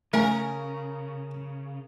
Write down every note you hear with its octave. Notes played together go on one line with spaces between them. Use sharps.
C#3 A3 A#4 F5 G#5